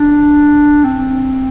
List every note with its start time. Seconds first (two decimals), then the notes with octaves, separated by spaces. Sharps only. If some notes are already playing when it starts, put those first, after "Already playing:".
Already playing: D4
0.85 C4